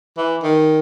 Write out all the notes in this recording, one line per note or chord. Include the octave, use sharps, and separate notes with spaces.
E3
D#3